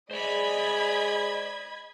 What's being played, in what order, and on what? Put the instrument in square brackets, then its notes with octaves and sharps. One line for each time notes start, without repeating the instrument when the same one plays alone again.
[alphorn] G#3 [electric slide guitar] C5 D5 [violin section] D#5 B5 G#6